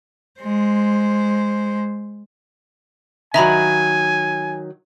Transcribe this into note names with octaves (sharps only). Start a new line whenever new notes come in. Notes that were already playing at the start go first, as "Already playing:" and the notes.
G#3 C5
D#3 F#3 E5 G#5 A#5 B5